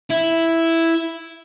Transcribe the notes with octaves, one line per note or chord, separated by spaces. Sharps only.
E4